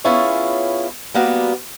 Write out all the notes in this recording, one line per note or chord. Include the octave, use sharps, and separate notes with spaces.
B3 C#4 E4 F4 G#4 C#5
G3 A#3 B3 F#4